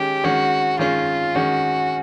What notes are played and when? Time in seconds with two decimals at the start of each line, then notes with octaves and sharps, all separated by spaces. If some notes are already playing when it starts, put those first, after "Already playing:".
Already playing: D#3 G#3 C#4 G4
0.24 D#3 G#3 C#4 F#4
0.79 D#3 G#3 C#4 F4
1.35 D#3 G#3 C#4 F#4